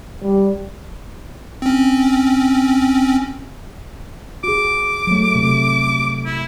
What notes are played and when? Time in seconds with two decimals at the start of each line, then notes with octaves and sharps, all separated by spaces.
0.22 G3
1.62 C4 C#4
4.44 F#4 G#4 D6
5.07 F#3 A3
5.35 C3 A3
6.25 E4